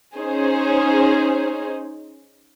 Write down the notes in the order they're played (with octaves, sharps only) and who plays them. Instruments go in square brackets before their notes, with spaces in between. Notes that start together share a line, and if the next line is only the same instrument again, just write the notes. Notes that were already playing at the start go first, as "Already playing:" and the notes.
[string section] C#4 D#4 G#4 C5